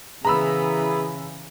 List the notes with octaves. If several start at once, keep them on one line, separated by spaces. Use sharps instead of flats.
C#3 E3 B3 E4 G#4 A#5 B5 E6